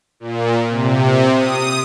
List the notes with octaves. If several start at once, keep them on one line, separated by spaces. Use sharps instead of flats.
A#2
C3
D#6